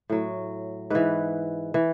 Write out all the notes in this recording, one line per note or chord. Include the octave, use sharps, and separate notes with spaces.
A2 F#3
G#2 E3 B4
E3